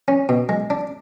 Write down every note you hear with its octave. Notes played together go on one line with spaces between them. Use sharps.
C#4
B2
G#3
D4